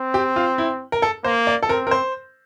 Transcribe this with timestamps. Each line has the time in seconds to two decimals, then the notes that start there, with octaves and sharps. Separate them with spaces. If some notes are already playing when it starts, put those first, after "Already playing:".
Already playing: C4
0.14 G4
0.36 F4
0.58 E4
0.92 A#4
1.02 A4
1.24 A#3 C5
1.47 D5
1.63 A4
1.69 C4 A#4
1.87 A#4
1.91 C5